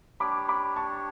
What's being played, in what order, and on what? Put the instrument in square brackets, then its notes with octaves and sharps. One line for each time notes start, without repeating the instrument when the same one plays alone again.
[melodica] D4 G4 C#5 [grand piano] B5 D6
[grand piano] B5 D6
A5 C#6